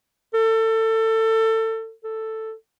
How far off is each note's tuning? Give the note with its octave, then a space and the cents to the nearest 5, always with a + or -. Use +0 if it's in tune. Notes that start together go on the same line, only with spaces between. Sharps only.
A4 +25
A4 +5